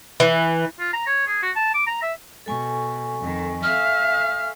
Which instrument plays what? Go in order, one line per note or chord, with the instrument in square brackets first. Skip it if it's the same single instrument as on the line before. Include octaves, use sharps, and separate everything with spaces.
[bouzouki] E3
[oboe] F4
A#5
C#5
G#4
F#4
A5
D6
A#5
E5
[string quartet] B2 [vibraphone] A4 G#5 C#6
[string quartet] F2 D#3
[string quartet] E5 F5 [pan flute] F6